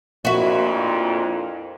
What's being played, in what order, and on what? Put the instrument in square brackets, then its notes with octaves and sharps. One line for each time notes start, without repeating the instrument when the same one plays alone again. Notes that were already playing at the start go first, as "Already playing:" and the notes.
[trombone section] A#1 F2 A#2 [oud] E4 F#4